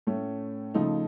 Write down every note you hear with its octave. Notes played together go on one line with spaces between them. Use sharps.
A2 A3 C#4
C#3 F3 A3 D#4